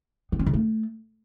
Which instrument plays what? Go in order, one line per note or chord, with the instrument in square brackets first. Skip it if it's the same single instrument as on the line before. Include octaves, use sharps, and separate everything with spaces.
[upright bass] B3
C#4
C#3
A3